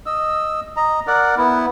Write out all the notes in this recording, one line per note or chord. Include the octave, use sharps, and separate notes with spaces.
D#5 E6
D#5 A#5
A#4 D5 F#5
B3 E4